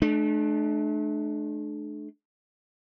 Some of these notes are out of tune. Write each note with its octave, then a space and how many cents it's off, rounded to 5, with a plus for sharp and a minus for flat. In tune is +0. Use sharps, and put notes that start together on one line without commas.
A3 -40 D4 +30